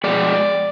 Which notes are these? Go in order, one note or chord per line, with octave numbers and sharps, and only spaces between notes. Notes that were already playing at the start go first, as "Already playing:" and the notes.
B2 G#3 D5